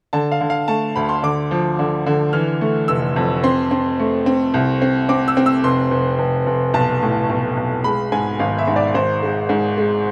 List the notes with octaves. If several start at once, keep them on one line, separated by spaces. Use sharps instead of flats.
D3 A5
F5
D3
F5
A3 A5
D2 B5
C6
D3 D6
F3
D3
D3
E3 F6
A3
F1 E6
F2
C4 C6
C4
A3
C4
C2
C4
C4 D6
E6
C4
E6
F1 C6
F1
F1
F1
B1 A5
A2
B1
B1
G#3 B5
G#2 G#5
G#1 F5
E5
G#2
D5
G#1 C5
G#3
G#2
G#3